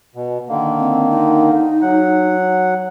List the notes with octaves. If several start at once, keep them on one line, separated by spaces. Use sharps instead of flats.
B2
D3 D#3 A#3
C4
D#4
F#3 F#5